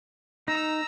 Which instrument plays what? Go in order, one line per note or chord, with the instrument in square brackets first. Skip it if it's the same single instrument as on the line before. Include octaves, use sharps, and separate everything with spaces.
[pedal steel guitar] D#4 [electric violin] A#5 E6